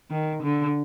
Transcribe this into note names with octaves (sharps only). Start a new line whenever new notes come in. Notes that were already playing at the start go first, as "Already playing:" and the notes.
D#3
D3